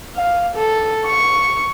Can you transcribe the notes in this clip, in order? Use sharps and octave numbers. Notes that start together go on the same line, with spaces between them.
F5
A4
C#6